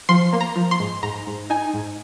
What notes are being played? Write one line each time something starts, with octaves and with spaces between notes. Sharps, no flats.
F3 C6
A#3
A#5
F3
C6
G#2
G#2 A#5
G#2
D#4 G#5
G#2